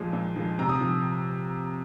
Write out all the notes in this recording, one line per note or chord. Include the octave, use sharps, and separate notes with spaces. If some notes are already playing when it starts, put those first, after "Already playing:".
Already playing: A#2 F3 G#3
A#2
F3 G#3
C3 A#5
D#6
F3